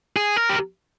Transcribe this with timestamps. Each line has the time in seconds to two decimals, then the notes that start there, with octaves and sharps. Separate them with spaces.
0.16 G#4
0.36 A#4
0.49 G4